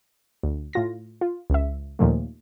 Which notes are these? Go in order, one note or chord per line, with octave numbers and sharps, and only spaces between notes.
D2
A2 F4 A#6
F4
C#2 E5
D#2 A#2 F3 A3